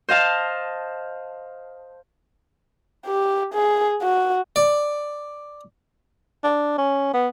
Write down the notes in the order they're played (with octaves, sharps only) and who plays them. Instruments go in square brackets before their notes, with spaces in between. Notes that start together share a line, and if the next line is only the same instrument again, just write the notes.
[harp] C5 D#5 F5 A5
[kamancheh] G4
G#4
F#4
[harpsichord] D5
[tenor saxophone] D4
C#4
B3